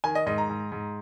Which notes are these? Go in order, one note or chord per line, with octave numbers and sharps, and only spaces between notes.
D#3 G#5
D#5
G#2 D#5
A#5
G#2
G#2